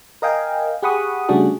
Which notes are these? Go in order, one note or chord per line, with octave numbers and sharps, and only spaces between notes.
A#4 D#5 F5 G5 G#5
G4 G#4 F#5 B5 C#6 D#6
C#3 G3 A3 D4 F#4 G#4